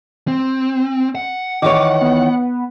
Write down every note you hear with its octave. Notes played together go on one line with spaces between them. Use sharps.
C4
F#5
D#3 E3 C#5 D6
B3